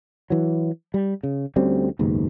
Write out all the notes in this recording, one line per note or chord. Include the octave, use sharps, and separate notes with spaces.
E3 F#3
G3
C#3
D2 G3 C4 C#4
F#1 D#2 G#2 B2